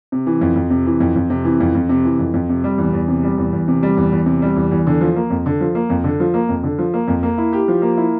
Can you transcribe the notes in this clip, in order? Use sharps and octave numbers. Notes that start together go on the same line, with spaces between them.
C3
E3
F2
F2
C3
E3
F2
F2
C3
E3
F2
F2
C3
E3
F2
F2
C3
G3
E2
E2
C3
G3
E2
E2
C3
G3
E2
E2
C3
G3
E2
E2
D3
F3
A#3
F2
D3
F3
A#3
F2
D3
F3
A#3
F2
D3
F3
A#3
F2
A#3
E4
G4
F3
A#3
E4